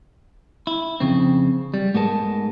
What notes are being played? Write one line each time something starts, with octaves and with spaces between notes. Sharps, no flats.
E4
F2 C#3 C4
G3
G#2 A3 B3 G#4 A#4 A5